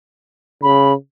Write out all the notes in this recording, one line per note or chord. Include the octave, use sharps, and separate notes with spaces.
C#3 B5